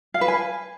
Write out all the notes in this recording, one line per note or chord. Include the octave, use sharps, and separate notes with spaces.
F5
B4
G#5